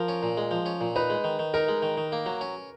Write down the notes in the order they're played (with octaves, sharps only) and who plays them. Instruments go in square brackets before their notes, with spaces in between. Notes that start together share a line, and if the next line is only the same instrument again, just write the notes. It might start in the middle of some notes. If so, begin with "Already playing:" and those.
Already playing: [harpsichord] F3 [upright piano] A#4
[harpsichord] C#4
A#2
G#3
F3
C#4
A#2
[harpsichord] D#4 [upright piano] B4
[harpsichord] G#3
D#3
D#3
[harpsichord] D#4 [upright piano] A#4
[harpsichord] G#3
D#3
D#3
A#3
F#3
C#4